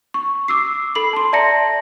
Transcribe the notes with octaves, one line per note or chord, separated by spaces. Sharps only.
C#6
D6 E6 C7
A4 B5 C7 F#7
A5 C6
D5 E5 A5 A#5 A#6 C#7